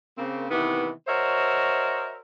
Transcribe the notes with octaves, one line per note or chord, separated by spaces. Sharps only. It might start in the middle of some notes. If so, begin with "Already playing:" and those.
C#3 A#3 C4
C3 D#3 E3 B3 E4
F#4 A#4 C5 C#5 D#5 E5